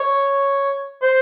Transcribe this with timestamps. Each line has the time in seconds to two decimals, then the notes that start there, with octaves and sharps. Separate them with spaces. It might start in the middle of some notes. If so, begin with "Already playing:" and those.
Already playing: C#5
1.02 C5